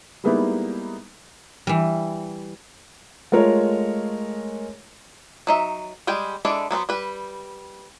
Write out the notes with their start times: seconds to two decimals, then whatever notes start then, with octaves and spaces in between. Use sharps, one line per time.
0.24 G3 G#3 A#3 B3 D#4 E4
1.67 E3 G3
3.32 G#3 A3 F4 A#4 C#5
5.47 F#3 D#4 E5
6.07 G3 G#3 G#4 G5
6.45 G#3 D4 E4 A4 D5
6.71 F#3 B3 A4 C5
6.89 G3 B4